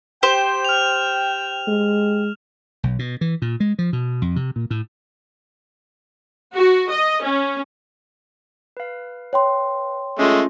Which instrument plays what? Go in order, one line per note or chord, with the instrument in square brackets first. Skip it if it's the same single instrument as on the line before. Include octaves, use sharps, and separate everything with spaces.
[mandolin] G4 C5 [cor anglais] G5 [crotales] E7
[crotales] F6 F7
[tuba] G#3
[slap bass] B1
B2
E3
A#2
G#3
F3
B2
F2
C3
A#2
A2
[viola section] F#4
D#5
C#4
[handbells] B4 F5
[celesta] C#5 G5 C6
[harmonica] G#3 A3 [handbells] C#4 F4